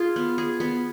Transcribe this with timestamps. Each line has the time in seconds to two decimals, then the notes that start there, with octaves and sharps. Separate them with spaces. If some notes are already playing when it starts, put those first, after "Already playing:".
Already playing: F4 G#4
0.16 B3
0.38 G#4
0.60 B3